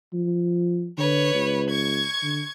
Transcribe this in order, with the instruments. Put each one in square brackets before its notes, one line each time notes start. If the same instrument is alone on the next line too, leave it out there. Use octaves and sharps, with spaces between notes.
[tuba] F3
[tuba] D3 [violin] B4 C#5
[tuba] C#2
[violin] C#6 G#6
[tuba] D3